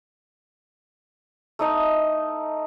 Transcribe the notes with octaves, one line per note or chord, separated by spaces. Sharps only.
A3 D#4 D#5